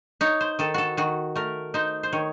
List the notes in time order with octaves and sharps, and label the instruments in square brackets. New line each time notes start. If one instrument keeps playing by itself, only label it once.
[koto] D#4 C#5
C5
D#3 A4
F#4 A4
D#3 F#4
A3 A#4
D#4 C5
C5
D#3 C#5